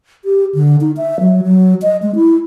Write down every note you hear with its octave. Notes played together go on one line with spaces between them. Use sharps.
G4
D3
D#4
E5
F#3
F#3
D#5
G#3
E4